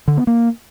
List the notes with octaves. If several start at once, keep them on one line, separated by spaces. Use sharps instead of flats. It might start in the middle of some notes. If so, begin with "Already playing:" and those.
D3
B3
A#3